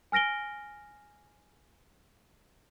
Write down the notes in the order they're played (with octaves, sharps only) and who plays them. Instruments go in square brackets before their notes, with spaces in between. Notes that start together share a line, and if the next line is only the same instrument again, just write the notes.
[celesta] G#5 F6 A#6 D7 G7